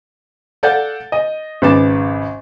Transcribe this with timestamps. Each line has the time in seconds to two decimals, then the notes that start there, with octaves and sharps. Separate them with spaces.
0.63 A4 D5 F5 F#5 G6 A6
1.12 D#5
1.62 G#1 C#3 B4 D6 A6 E7